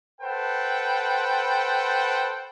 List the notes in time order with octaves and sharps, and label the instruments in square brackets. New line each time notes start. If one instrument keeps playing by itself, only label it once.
[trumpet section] A4 B4 C5 F#5 G5